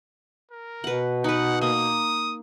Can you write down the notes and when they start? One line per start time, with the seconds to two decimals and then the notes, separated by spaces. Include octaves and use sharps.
0.51 A#4
0.84 B2 B4 F#5
1.24 D#4 B4 F#5
1.61 A#3 D#6